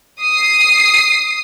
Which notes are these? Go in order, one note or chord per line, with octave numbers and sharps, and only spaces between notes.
D#6 C7